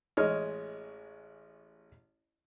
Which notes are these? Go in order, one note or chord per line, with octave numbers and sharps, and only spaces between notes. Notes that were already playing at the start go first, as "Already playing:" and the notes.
A1 G#3 C#5 D#5 F6